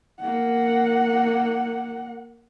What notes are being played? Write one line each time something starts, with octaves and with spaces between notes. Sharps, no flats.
A#3 F#5